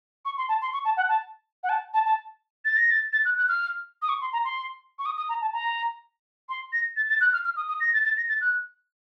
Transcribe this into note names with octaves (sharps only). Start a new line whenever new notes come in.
C#6
C6
A5
C6
C#6
A5
F#5
A5
F#5
A5
A5
A5
A6
A#6
A6
A6
F#6
F#6
F6
D#6
C#6
C6
A#5
C6
C#6
D#6
D#6
A#5
A5
A#5
C6
A#6
A6
A6
F#6
F6
F6
D#6
D#6
A#6
A6
A6
A#6
A6
F#6